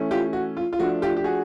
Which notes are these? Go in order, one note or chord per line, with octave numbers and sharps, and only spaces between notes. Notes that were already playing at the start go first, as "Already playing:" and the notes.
Already playing: E3 A3 C#4
F4 G4
F#4
F4
F4
F3 A3 D4 F#4
F4 G4
G4
F#4 G#4